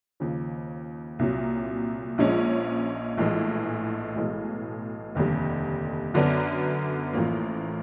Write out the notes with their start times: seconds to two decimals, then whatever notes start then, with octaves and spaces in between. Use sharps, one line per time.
0.20 D#2 C#3 F3
1.19 C2 A#2 F#3
2.18 A#1 A#2 F3 G#3 C#4
3.17 A#1 A2 E3 G#3
4.16 B1 A2 E3 G#3
5.15 F1 D#2 D3 G3
6.14 F#2 D3 F#3 B3 D4
7.13 A1 A2 F3 A#3